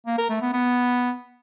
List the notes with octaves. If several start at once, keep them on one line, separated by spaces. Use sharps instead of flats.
A#3
A#4
A3
B3
B3